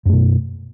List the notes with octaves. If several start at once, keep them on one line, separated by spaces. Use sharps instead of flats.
F#2 B2 A3